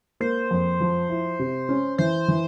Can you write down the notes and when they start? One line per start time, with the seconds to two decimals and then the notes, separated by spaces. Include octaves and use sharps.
0.20 A#3 C5
0.51 F2
0.80 F3
1.09 E4
1.39 C3
1.69 C#4
1.98 E3 C5
2.28 E3